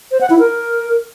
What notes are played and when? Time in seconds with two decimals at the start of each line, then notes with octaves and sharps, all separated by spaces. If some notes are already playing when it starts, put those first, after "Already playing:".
0.11 C5
0.21 F#5
0.30 E4
0.39 A#4